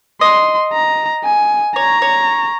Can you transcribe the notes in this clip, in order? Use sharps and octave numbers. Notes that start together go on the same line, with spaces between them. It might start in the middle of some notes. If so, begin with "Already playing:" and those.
D#5 C6
A#5
G#5
C#5 A#5
C#5